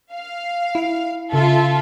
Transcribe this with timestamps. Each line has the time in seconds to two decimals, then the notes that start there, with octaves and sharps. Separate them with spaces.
0.12 F5
0.75 E4 D7
1.32 C#3 F4 A4 E5